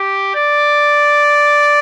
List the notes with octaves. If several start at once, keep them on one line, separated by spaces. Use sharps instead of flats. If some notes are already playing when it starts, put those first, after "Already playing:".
Already playing: G4
D5